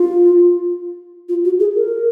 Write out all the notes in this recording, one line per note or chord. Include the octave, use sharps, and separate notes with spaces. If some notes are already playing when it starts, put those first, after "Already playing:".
Already playing: F4
F4
F#4
G#4
A#4